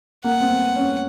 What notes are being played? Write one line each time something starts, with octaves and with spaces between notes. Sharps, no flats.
A#3 F#5
C4
B3
C#4